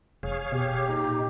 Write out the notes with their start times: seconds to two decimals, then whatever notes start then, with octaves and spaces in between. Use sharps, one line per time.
0.23 F1 G#4 C#5 F5
0.52 B2 G4
0.88 A#2 D#4